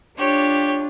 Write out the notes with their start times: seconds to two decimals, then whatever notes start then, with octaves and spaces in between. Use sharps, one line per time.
0.18 D4 F4 G4 C#5